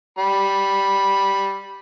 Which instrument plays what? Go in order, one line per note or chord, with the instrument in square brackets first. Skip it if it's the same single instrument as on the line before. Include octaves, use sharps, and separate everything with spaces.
[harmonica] G3 B5